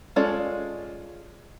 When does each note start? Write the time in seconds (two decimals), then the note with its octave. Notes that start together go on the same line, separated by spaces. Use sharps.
0.16 G#3 C#4 F4 A4 D5